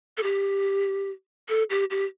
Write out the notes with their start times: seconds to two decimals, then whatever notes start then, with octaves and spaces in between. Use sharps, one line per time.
0.17 A4
0.23 G4
1.49 A4
1.70 G4
1.91 G4